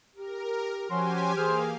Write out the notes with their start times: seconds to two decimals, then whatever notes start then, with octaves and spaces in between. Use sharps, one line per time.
0.15 G4 A#4
0.90 F3 C#4 F#4 G4 G#5 C6
1.37 E3 A#3 G#4 C5 F5 F6